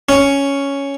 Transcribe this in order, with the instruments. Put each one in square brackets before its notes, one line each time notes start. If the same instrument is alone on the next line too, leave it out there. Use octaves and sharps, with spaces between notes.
[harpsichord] C#4